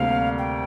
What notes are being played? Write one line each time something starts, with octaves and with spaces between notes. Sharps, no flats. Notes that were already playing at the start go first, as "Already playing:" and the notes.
Already playing: D2 C3 G3 A#3 F5
G5